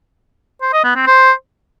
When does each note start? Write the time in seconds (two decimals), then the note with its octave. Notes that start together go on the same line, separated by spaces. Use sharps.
0.62 C5
0.73 D#5
0.84 B3
0.95 C4
1.06 C5